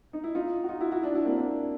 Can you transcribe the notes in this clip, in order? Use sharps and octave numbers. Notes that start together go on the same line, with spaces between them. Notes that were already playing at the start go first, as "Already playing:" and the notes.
D#4
E4
D#4 F4
F#4
D#4 F4
E4 F#4
E4 F#4
D4 E4
E4 F#4
A#3 C4
C4 D4